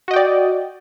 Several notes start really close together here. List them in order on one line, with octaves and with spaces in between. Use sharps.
F#4 D#5 G5 D5